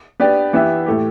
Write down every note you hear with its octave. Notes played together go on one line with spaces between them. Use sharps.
B3 D4 G4 B4 D5
E3 B3 G4 E5
A2 A3 E4 G4